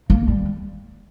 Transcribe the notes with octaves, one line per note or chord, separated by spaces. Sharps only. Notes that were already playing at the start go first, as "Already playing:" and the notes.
A#3
G3